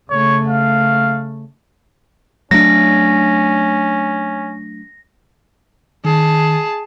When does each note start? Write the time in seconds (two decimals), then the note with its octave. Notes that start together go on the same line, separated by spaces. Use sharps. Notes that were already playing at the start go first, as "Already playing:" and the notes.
0.10 C#3 A3 C#5
0.48 F5
2.51 F#3 A3 C#4 D4 A#6
6.05 D#3 G#4 A5